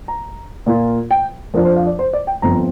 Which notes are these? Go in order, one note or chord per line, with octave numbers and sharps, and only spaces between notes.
A#5
A#2 A#3 F4
G5
F2 F3 D4 A#4
C5
F5
D5
C5
D5
G5
G1 F2 F3 C4 A#5